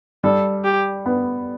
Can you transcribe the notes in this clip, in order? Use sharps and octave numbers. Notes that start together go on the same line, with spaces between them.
G3 A4
G4
B3